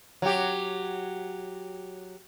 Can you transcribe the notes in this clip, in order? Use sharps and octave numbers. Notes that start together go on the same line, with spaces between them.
F#3 G4